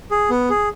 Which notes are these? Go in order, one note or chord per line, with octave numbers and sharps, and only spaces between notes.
G#4
B3
G#4